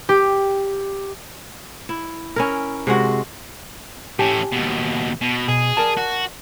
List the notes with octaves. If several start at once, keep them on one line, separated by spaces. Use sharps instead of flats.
G4
E4
C#4 E4 A#4
C3 G#3 F#4
A2 C#4 G4 G#5 A5
D#2 B2
B2
B2 G#4
A#4 D5 A5
F#4